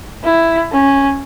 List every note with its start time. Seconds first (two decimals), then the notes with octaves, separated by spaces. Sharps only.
0.24 E4
0.72 C#4